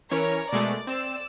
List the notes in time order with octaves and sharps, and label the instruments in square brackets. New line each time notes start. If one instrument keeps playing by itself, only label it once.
[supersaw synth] E3 C#4 [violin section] A#4 C#5
[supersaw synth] B2 G#3 A3 [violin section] D5
[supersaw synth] C4 [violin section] D5 E6